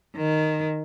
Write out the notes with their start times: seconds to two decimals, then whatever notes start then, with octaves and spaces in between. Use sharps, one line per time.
0.16 D#3